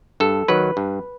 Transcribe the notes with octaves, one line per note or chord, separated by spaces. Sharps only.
G2 A4
D#3 F#3 B4
G2